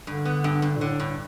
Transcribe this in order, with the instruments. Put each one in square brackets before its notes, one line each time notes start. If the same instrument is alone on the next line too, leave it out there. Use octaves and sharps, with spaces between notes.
[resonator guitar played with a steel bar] G2 [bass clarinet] D3
[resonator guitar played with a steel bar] B3
G2
G2
[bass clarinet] A#2
[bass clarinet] A2 [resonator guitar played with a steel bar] D3
[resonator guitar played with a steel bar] G2